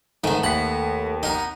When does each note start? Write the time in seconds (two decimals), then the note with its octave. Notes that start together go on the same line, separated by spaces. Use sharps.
0.24 G#2 D#3 A3 B3 D#4
0.43 D#2 F#5 B6
1.23 B3 D#4 A#4